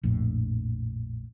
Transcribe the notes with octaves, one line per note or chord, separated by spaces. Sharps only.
A#1 F2 A2